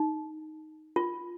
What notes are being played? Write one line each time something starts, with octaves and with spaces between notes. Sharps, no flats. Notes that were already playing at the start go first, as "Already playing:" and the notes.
Already playing: D#4
F4